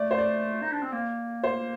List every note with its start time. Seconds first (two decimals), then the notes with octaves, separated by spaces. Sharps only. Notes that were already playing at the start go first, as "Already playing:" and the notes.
Already playing: A3 D5
0.11 C5
0.18 D5
0.62 D#4
0.72 D4
0.83 C4
0.93 A#3
1.43 C5